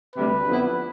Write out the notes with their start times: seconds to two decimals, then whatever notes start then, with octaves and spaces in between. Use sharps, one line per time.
0.16 D2 C3 G3 B4
0.46 F2 D3 F3 B3 E4